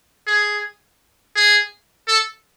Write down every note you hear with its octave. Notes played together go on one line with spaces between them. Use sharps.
G#4
G#4
A4